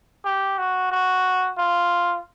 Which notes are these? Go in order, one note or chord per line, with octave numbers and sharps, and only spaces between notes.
G4
F#4
F#4
F4